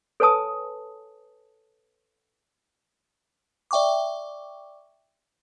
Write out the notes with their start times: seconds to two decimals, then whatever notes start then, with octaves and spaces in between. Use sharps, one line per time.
0.20 A4 B4 C#5 G#5 A5 D#6
3.71 D5 E5 G5 C#6 D6